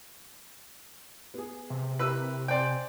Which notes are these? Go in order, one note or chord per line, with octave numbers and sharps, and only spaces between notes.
B3 G#4
C3
E4 G4 A#4 B4 E6
C5 D5 G5 G#5 C6